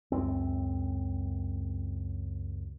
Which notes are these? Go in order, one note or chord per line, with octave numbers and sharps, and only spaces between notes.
C#2 F#2 C4